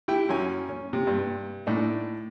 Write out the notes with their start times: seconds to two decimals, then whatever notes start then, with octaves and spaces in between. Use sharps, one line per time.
0.08 E4 G4 G5
0.29 F#2 C#4 G#5
0.69 C#4
0.93 C3
1.07 G2
1.67 A2 D4 D#4